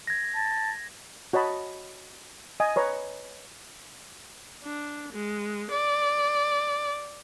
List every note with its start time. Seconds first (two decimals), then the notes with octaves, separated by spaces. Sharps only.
0.07 G#6 A#6
0.35 A5
1.33 F#4 C#5 D#5 A5 B5
2.60 D#5 G#5
2.76 B4 C#5 A#5
4.63 D4
5.13 G#3
5.71 D5